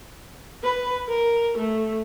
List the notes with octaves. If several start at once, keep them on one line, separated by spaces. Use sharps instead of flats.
B4
A#4
A3